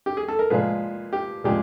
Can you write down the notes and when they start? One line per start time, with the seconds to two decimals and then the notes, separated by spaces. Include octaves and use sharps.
0.06 G4
0.17 G#4
0.28 A4
0.39 A#4
0.50 A#2 F3 G#3 B4
1.13 G4
1.44 A#2 F3 G#3 G4